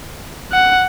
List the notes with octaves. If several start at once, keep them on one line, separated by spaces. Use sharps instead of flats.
F#5